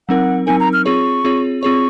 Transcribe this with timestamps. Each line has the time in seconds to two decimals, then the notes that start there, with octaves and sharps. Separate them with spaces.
0.09 F#3 C4 D#4 A#4 F#5
0.47 F#3 C4 D#4 A#4 G#5
0.60 A#5
0.73 F6
0.86 C4 F4 G#4 C#5 C#6
1.25 C4 F4 G#4 C#5
1.63 C4 F4 G#4 C#5 C#6